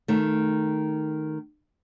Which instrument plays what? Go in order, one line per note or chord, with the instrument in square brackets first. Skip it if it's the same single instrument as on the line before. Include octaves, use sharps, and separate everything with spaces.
[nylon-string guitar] D#3 A3